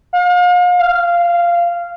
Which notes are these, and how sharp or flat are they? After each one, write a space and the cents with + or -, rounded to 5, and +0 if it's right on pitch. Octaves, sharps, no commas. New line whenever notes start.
F5 +40
F5 -10